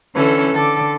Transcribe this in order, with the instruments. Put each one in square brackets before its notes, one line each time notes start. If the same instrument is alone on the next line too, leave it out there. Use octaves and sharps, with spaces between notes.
[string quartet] D3 E3 C#4 A4
D3 A4 D6